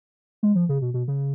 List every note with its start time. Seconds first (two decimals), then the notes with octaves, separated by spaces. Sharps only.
0.43 G#3
0.55 F3
0.69 C#3
0.82 B2
0.94 B2
1.08 C#3